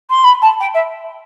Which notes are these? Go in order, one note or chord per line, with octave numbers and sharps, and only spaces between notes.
C6
B5
A5
G5
E5